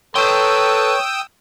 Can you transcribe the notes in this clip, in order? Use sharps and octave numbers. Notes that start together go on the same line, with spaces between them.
A4 B4 C#5 G5 C6 D#6 E6